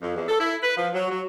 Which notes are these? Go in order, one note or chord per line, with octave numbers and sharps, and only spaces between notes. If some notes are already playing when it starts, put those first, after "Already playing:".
F2
E2
A4
E4
B4
F3
F#3
F#3